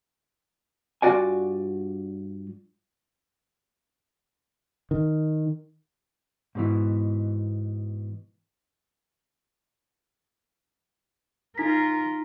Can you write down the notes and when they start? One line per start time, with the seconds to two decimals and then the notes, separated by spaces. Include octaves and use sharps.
1.02 G2 F4 F#4 D5 G#5
4.91 D#3
6.55 G#2 B2 E3
11.58 D#4 F4 A#4 B6